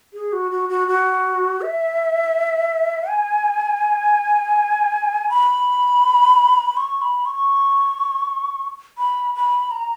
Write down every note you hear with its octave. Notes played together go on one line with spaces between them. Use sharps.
G#4
F#4
F#4
F#4
F#4
E5
G#5
B5
C#6
B5
C#6
B5
B5
A#5